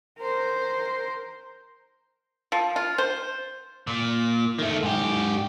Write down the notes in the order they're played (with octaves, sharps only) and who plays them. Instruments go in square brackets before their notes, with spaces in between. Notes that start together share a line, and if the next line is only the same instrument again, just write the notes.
[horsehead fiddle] A#4 C5
[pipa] F3
F4
C5
[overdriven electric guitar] A#2
D#3 A3
G#2 G4